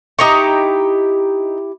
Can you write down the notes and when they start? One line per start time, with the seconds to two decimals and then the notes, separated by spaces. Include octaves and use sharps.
0.19 D#4 E4 G4 A#5 C#6